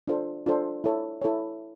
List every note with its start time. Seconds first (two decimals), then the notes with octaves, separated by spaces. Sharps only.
0.08 D4 F4 A4 C5
0.46 D4 F4 A4 C5
0.84 E4 A4 C#5
1.22 E4 A4 C#5